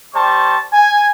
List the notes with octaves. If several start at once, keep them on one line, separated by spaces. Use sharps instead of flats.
G3 C5 A5 C#6
G#5